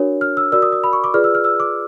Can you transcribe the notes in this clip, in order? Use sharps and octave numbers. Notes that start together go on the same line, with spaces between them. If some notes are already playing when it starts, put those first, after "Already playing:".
Already playing: D4 F#4 A#4 C#5
F6
E6
F#4 A#4 D5 E6
D#6
D#6
B5
C#6
D6
F4 G#4 B4 D5 F6
E6
F6
E6
D6